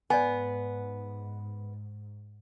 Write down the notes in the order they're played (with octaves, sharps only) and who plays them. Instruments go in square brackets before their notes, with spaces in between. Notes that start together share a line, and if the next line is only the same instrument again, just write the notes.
[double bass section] G#2 [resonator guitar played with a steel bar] B3 [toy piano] D5 G#5